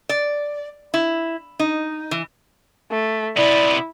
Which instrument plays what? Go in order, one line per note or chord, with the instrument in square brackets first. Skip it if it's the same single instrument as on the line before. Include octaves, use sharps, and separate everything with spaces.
[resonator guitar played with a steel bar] D5
E4
D#4
E3
[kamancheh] A3
[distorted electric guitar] C3 B3 [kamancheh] E4 [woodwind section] D5